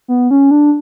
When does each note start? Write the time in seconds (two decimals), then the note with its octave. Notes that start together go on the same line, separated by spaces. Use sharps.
0.08 B3
0.31 C#4
0.51 D4